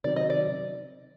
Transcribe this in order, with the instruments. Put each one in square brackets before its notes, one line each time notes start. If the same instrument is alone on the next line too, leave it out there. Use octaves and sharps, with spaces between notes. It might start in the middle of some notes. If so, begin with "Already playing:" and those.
[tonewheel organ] C3 D#3 F#3 C4 [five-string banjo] D5
[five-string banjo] D#5
D5